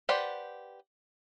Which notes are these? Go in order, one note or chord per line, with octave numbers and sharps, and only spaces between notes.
G4 B4 C5 D5 F#5